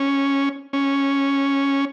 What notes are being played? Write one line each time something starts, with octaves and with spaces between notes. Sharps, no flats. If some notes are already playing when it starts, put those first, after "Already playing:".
Already playing: C#4
C#4